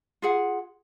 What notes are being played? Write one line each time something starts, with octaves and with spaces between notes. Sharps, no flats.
F4 G#4 F#5